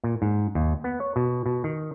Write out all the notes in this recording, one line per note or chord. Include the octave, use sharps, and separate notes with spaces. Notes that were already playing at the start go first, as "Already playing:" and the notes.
A#2
G#2
D#2
B3
C#5
B2
B2
D#3